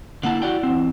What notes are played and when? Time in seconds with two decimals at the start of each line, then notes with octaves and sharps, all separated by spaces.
0.23 D3 A#3 E4 F#5 A5
0.42 F#4 D5 G5
0.63 E2 C4